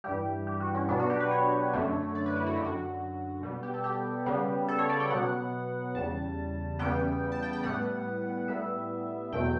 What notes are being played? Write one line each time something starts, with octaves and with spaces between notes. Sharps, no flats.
G2 E3 G3 G4
G4
F#4
C#4
B2 F#3 B3 D4
F#4
G4
B4
C#5
F#2 D3 A3
D5
B4
E4
F#4
F#2 D3 F#3 G4
F#4
B2 G3 B3
G4
A4
G4
C#3 G3 B3
A4
C#5
D5
G5
B2 F#3 B3 F#5
E2 C#3 G3 A5
E2 C#3 G3 B3 G5
A5
G5
G5
A2 G3 B3 F#5
A2 G3 B3 E5
E2 B2 F#3 A3 G5